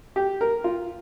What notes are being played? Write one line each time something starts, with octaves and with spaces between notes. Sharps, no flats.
G4
A#4
F4